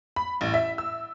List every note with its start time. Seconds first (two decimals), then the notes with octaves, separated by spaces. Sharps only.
0.16 B5
0.41 A1
0.54 E5
0.78 E6